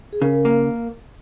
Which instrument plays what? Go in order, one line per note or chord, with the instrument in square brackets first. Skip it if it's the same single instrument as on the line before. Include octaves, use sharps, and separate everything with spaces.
[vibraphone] G#4
[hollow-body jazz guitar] C#3 [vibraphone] A#4
[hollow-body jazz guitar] A#3